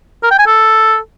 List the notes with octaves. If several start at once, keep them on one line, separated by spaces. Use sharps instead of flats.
A#4
G5
G#5
A4